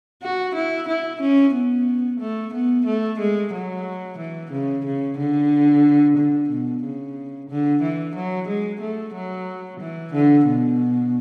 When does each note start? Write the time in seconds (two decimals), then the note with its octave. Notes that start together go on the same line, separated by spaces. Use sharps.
0.22 F#4
0.55 E4
0.88 E4
1.21 C#4
1.54 B3
2.20 A3
2.53 B3
2.86 A3
3.19 G#3
3.53 F#3
4.18 E3
4.52 C#3
4.85 C#3
5.18 D3
6.17 D3
6.50 B2
6.83 C#3
7.49 D3
7.82 E3
8.15 F#3
8.48 G#3
8.81 A3
9.14 F#3
9.80 E3
10.13 D3
10.47 B2